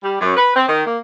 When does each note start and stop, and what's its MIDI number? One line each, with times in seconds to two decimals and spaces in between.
0.03 0.19 55
0.20 0.32 42
0.37 0.50 71
0.55 0.63 60
0.67 0.83 51
0.86 0.98 58